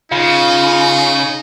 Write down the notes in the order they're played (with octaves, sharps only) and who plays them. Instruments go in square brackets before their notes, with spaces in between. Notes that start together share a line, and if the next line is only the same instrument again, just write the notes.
[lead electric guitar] C#3 [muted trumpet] D#4 [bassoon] F4